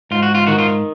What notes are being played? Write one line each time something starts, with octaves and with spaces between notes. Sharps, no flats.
G#2 F4
F#4
F4
D#3 F#4
F4